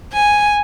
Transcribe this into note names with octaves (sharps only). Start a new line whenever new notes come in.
G#5